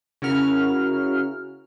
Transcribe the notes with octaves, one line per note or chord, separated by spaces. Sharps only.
C#3 C#4 E4 F#4 A#4 F6